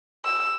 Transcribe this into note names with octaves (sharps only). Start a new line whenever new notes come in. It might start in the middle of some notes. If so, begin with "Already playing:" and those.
E6